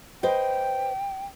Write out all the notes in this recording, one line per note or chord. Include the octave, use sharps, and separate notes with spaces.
B4 C5 D#5 G5